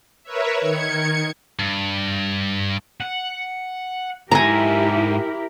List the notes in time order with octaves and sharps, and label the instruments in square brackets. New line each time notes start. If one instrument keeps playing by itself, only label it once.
[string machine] A#4 B4 C#5 E5
D#3 G#6 C#7
[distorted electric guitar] G2
F#5
[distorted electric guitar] G#2 A4 [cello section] E4 G4 A#4 [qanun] G#5 A#5